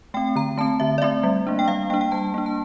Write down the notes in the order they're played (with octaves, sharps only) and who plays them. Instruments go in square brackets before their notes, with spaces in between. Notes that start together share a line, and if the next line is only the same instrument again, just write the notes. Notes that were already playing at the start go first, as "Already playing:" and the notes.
[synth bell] A3 C4 G5
D3 A#5
A3 C4 A5
D3 E5
D5
A3 C4 E5
G3
A#3 D4
G5
G3 F5
A#3 G5
D4
G5
G3 A5
A#3 D4
A5